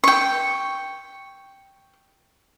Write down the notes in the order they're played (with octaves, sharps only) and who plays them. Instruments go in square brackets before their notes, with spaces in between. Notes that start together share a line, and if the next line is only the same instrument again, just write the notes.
[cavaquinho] G5 C#6